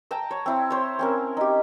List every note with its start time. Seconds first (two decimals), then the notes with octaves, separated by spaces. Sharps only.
0.11 G5 A5 A#5 E6
0.31 C#5
0.46 C4 E4
0.70 C5 C#5
0.99 C4 C#4 A#4
1.37 D#4 G4